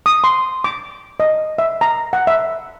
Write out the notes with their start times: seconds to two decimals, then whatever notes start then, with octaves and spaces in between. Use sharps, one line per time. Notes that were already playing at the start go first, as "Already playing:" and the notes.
0.06 D#6
0.24 C6
0.64 D6
1.20 D#5
1.58 E5
1.81 A#5
2.13 F#5
2.27 E5